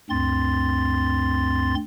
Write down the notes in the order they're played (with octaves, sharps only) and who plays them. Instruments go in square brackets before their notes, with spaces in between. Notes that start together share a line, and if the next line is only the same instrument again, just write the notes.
[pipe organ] D2 G2 C4 C6 A6